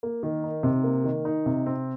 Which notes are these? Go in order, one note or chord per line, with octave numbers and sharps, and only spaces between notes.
A#3
D#3
D#4
C3
A#3
D#3
D#4
C3
C4